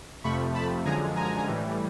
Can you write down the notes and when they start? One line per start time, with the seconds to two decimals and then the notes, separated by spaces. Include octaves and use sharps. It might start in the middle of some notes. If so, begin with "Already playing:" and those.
0.24 F2 C3 F3 A3 B5 C#6
0.54 A5 B5
0.85 F#2 D3 F3 G#3 G#5 A#5
1.16 G#5 A#5
1.46 A2 E3 G3